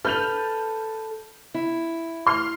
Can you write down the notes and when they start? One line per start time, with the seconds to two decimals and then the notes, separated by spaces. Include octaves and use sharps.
0.05 A4 B4 F6 G6 F7
1.54 E4
2.27 C6 F6 C7